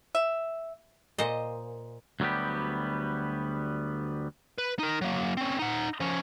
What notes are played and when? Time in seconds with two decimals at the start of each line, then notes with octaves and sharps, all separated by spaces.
0.15 E5
1.18 A#2 C5 D#5
2.20 D2 F#3 G3 B3 G4
4.58 B4
4.79 D#4 A#4
5.01 F#3 A#3
5.37 C4 C#4
5.59 D#4 F#5
6.00 F3 C#4